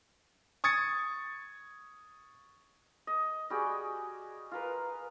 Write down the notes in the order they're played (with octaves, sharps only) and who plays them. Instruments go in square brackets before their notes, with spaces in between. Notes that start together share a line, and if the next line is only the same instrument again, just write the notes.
[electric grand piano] C#6 D#6 G#6 A6 C#7
[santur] D#5
G3 F#4 G#4 G5
F4 A#4 B4